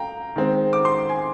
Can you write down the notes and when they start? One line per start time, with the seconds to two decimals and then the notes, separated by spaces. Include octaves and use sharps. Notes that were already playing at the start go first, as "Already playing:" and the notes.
Already playing: F5 G5 A#5
0.36 D#3 G#3 C4
0.73 D6
0.85 C6
1.09 G#5